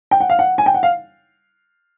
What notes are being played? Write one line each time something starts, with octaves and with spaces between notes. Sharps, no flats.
G5
F#5
F5
F#5
G#5
G5
F#5
F5